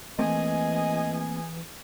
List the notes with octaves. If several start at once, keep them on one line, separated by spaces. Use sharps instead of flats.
E3 A3 A#3 C4 G#4 D#5 G#5